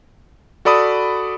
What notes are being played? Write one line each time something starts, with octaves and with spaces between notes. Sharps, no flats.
F#4 A4 D5 B5 D#6